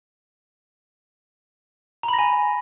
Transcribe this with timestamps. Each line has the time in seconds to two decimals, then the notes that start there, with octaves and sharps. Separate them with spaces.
2.03 A#5
2.08 B5
2.13 A#6
2.19 G#5